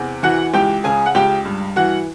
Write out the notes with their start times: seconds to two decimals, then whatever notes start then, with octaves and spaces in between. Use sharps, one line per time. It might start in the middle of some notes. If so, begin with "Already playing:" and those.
Already playing: E2 C3
0.23 E3 F#4 F#5
0.53 C#2 G4 G5
0.84 C#3 G#4 G#5
1.06 F#5
1.15 C#2 G4 G5
1.45 G2
1.76 E3 F#4 F#5